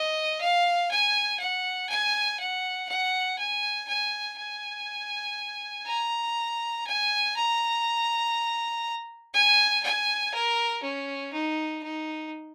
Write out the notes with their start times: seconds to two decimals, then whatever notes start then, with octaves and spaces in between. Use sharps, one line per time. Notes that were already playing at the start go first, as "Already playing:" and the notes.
Already playing: D#5
0.41 F5
0.91 G#5
1.40 F#5
1.89 G#5
2.40 F#5
2.89 F#5
3.39 G#5
3.88 G#5
4.38 G#5
5.87 A#5
6.87 G#5
7.36 A#5
9.34 G#5
9.83 G#5
10.34 A#4
10.83 C#4
11.33 D#4
11.83 D#4